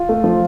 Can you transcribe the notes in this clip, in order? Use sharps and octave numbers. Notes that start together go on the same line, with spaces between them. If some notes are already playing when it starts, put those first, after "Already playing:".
Already playing: F4
A3
F3